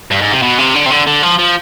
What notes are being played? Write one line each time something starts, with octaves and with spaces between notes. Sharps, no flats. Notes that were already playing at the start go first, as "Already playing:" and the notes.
G2
G#2
C3
B2
C3
D3
C3
D3
D3
F3
F3